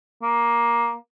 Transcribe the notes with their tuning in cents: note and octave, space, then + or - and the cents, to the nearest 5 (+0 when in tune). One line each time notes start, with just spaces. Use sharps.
A#3 +15